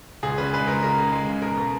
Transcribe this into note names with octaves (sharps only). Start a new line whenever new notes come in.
C#2 G#4
C#3 B4
G#3 B4
C#2 A#4
C#3 A#4
C#2
G#3
C#3
B2 A#4
B2